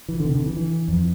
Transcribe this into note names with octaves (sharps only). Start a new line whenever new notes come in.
E3
D3
C3
D3
E3
E3
F2